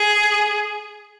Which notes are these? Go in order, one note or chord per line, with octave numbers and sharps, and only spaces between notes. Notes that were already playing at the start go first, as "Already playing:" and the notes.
Already playing: G#4